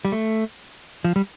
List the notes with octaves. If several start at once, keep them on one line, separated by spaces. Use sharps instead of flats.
G3
A3
F3
G3